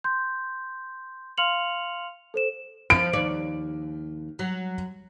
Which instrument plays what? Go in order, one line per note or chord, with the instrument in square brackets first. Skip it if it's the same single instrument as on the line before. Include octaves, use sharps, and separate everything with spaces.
[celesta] C6 G6
F5 C6 F6 C#7 F7 F#7
A4 C5 E7
[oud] F3 [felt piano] D7
[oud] D#2 C#5 D5
F#3